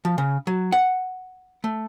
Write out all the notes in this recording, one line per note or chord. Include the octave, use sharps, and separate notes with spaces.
F3
C#3
F#3
F#5
A3